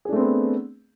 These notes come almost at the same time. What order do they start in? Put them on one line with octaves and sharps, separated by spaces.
G#4 D4 A3 C4 B3